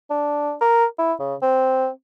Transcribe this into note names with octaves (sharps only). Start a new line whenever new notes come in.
D4
A#4
E4
C#3
C4